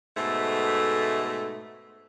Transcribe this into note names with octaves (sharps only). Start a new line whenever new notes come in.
G#2 B2 A3